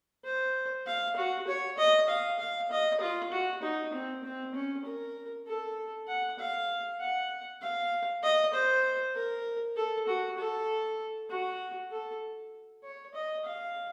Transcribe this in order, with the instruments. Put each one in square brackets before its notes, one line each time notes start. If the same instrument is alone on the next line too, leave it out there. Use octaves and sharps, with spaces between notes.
[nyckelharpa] C5
F5
F#4
C#5
D#5
F5
F5
D#5
F4
F#4
D#4
C4
C4
C#4
A#4
A4
F#5
F5
F#5
F5
D#5
C5
A#4
A4
F#4
A4
F#4
A4
C#5
D#5
F5